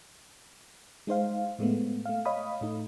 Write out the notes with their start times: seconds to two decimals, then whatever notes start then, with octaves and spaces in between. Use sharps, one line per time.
1.07 G#3 D#4 C5 F5
1.59 A2 G#3 A3 B3
2.06 A3 F5
2.25 C#5 D#5 F5 B5 D#6
2.61 A2 A3 D#4